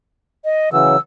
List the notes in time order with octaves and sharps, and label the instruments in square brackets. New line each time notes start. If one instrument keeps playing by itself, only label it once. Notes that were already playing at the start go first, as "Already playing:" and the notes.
[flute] D#5
[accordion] C#3 E3 F#3 [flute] E6